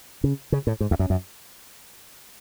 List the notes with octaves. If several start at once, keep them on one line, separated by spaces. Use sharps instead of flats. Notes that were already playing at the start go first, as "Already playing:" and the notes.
C#3
C#3
A2
G#2
E2
F#2
F#2